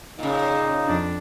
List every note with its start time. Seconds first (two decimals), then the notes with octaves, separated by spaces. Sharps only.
0.19 A#2 C#3 D#4
0.88 F2 D4